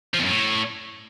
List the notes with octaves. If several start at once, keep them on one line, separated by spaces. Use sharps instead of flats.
F3
E2
F#2
A2